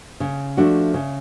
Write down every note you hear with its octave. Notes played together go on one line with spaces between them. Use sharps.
C#3
F3 A3 D4 F#4
C#3